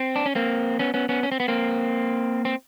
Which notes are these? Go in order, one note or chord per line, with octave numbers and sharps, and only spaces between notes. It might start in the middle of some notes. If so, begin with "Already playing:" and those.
Already playing: C4
D4
C#4
A#3 C4
B3 C#4
B3 C#4
B3 C#4
C#4
C4
B3
A#3 C4
C4